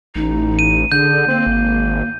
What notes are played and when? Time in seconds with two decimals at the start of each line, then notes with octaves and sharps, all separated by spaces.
0.15 A1 D#4
0.59 D#7
0.92 D3 G#4 G6
1.28 A#3 C4
1.47 G#1